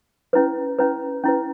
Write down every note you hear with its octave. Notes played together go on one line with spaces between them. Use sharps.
C#4 E4 B4
C#4 E4 B4
C#4 E4 B4